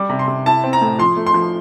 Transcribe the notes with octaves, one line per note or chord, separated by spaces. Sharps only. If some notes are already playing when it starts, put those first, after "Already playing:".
Already playing: G3 D6
C3
C6
C3
E4 A5
C4
A#5
A2
F3 C6
A3
C6
F3